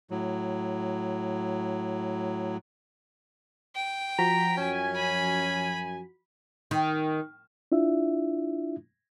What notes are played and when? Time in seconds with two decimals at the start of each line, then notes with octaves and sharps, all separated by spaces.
0.11 A2 F#3
3.75 G5
4.18 F3 F#4 A#5 B6
4.57 F#2 C#4 G#5
4.95 B5
6.71 D#3
7.72 D4 E4 F4 E5